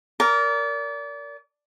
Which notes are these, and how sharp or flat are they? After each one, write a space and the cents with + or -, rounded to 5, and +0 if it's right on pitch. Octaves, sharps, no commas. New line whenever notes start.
A#4 -5 D5 -30 A#5 +0